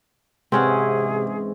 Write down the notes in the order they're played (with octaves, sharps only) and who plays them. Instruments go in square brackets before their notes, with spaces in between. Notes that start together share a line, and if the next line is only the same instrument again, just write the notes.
[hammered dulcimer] G#2 E3 [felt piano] C3 [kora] C4 C#4 F#5 [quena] G#4